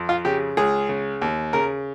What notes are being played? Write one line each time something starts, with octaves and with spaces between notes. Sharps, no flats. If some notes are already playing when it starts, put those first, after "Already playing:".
Already playing: F2
F4
C#3 G4
C#2 G#4
C#3
D#2
C#3 A#4